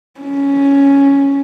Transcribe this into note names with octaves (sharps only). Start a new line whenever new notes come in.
C#4